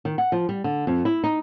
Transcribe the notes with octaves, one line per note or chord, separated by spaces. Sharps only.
D#3
F#5
F3
G3
D3
F2
E4
D#4